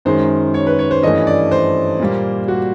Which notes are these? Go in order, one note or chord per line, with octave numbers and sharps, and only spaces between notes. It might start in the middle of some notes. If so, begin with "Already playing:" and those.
F#2 D#3 G#3 C#4 C5
C#5
B4
C#5
C5
G2 E3 A3 C#4 D#5
D5
C5
A#2 G3 A#3
F#4